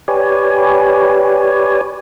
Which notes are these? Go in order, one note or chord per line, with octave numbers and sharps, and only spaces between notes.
G4 B4 C#5 D5 G#5